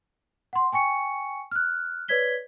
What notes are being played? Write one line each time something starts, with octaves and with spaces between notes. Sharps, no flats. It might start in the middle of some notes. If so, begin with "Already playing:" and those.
F#5 C6
G5 G#5 C#6 C#7
F6 F#6
B4 C#5 D5 G#6 B6 G7